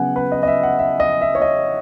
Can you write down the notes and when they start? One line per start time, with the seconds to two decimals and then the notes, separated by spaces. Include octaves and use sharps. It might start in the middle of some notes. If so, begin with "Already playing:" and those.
Already playing: C#3 F#3 B3 F#5 G#5
0.16 B4
0.32 D#5
0.43 D#5
0.48 E5
0.63 F#5
0.79 E5
1.00 D#5
1.21 E5
1.35 C#5
1.42 D#5